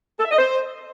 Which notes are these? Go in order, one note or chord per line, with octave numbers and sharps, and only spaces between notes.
A4
E5
D#5
C5